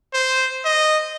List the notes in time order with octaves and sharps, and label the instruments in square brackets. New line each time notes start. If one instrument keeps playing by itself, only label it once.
[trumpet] C5
D#5